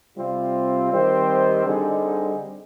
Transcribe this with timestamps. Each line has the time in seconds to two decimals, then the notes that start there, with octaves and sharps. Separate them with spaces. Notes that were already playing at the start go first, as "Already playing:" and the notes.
0.17 C3 G3 C4 F4
0.92 D#3 G3 C4 G4 C5
1.65 D3 G3 C4 D#4 G#4